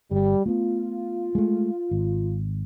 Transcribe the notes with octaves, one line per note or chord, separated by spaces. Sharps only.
G1 G3
A3 B3 F4
G#3 A3
G#1